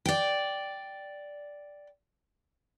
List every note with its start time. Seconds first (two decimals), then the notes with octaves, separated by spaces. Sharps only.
0.06 D5 G5